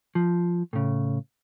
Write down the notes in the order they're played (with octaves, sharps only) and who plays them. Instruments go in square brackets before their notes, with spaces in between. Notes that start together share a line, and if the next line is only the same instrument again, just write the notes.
[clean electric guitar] F3
A2 C#3